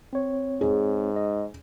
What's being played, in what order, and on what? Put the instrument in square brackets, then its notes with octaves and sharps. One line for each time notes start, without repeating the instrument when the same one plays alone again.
[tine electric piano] C4 C#5
[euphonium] G#2 [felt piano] G#4
[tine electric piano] D#5